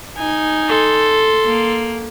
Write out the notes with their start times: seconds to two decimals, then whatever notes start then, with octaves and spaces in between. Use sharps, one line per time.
0.17 D#4 G#5
0.68 A4 C6
1.46 A#3